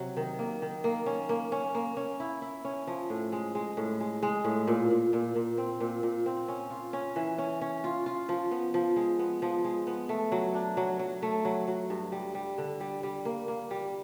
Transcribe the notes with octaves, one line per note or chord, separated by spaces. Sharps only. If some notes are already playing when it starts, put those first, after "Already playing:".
Already playing: C3 F#3
D#3
A#3
D#3
A#3
C#4
A#3
C#4
A#3
C#4
E4
E4
C#4
F3
A2
G#3
G#3
A2
G#3
G#3
A2
A#2
A#2
A#2
A#2
C4
A#2
A#2
C4
C#4
F4
C#4
E3
C#4
C#4
F4
F4
F3
B3
F3
G#3
B3
F3
G#3
B3
A3
F#3
D4
F#3
F#3
A3
F#3
F#3
G2
G3
G3
D3
G3
G3
A#3
A#3
G3